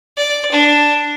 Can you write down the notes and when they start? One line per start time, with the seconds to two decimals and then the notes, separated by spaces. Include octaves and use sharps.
0.16 D5
0.51 D4